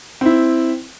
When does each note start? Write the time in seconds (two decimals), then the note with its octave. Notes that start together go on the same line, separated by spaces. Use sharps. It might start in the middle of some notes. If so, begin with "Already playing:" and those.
0.21 C4 E4